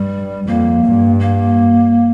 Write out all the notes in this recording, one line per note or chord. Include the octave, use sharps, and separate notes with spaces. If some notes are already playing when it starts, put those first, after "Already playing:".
Already playing: G2 G3
F2 A#3
G2
A#3